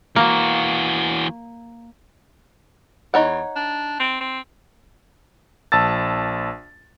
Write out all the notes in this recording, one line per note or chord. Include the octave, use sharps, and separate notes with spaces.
E3 A#3 F#4
E2 D#4 C#5 F#5
D4
C4
C4
A#1 A5 E6 A6